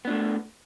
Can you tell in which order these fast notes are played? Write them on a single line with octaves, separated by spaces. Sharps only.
B3 D4 A3